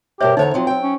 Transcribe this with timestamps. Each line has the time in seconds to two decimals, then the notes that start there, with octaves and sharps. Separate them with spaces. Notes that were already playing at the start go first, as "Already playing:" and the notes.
0.20 G2 B2 G4 A#4 C5 C#5 E5
0.37 E2 D3 D#4 C5 C#5 A#5
0.54 F3 F#3 C4
0.67 F#3 G5
0.83 C#4